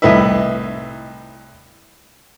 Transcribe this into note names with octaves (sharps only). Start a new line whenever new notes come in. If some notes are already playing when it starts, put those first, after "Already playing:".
C2 A2 D#4 B4 E5